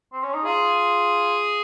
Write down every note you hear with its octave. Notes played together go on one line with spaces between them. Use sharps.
C4
C#4
D#4
F4 G#4